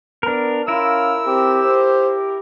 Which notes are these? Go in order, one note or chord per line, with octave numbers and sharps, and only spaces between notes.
B3 D4 A#4
C#4 E4 F4 A#4 E6
C4 G4
C5